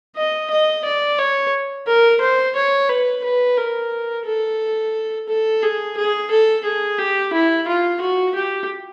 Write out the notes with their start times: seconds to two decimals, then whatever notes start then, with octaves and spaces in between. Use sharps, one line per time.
0.16 D#5
0.50 D#5
0.84 D5
1.18 C#5
1.87 A#4
2.21 C5
2.55 C#5
2.89 B4
3.23 B4
3.57 A#4
4.25 A4
5.29 A4
5.63 G#4
5.97 G#4
6.30 A4
6.64 G#4
6.98 G4
7.32 E4
7.67 F4
8.01 F#4
8.35 G4